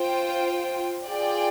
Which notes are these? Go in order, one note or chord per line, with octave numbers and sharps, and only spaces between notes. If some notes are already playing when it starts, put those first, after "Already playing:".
Already playing: F4 C5 G5
F4 G#4 D5 G5